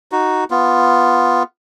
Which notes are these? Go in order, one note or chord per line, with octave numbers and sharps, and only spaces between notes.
D#4 F#4
B3 F4